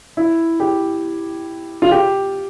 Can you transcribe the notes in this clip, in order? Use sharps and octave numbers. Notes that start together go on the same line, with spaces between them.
E4
G4
F4
G4